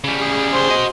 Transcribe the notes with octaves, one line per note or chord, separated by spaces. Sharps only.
C#3 G3
G#4
C5
F#4 D#5